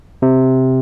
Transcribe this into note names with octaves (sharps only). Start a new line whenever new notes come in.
C3